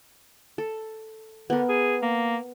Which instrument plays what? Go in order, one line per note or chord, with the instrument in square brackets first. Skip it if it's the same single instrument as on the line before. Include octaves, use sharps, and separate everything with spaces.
[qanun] A4
[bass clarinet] D3 [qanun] B3 A#4
[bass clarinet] G#4
A#3